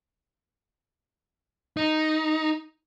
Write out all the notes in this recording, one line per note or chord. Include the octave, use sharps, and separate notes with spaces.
D#4